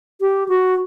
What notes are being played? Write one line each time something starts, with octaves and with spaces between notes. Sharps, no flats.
G4
F#4